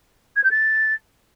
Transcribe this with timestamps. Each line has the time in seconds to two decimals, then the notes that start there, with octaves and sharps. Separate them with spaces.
0.36 G#6
0.44 G6
0.51 A6